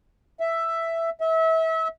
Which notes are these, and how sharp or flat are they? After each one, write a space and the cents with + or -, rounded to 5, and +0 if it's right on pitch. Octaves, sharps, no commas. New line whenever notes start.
E5 +5
E5 -30